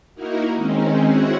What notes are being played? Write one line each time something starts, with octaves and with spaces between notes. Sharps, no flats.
A#3 D#4 E4 F#4 A#4
D#3 G#3 C4 C#4 D#4
C4 C#4 E4 F#4 G#4 F#5